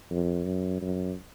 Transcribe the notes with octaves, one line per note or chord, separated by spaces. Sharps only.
F2
F#2
F#2